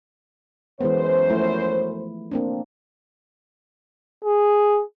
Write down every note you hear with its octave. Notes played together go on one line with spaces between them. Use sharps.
F#2 E3 G#3 B3 C5
F3 A3 E4
A#3 C4 D4
G#4